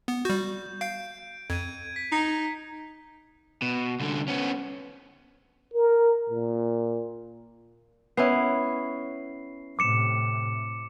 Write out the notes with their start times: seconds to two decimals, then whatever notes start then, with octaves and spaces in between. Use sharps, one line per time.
0.08 B3
0.25 G3 F#4 G6
0.81 F5 G6 D7
1.50 F2 G#6 D#7
1.96 B6
2.12 D#4
3.62 B2
4.00 C2 D3
4.28 B3 C#4
5.74 A#4
6.30 A#2
8.17 B3 C#4 E4 C7
9.79 A2 C3 D6 C#7 E7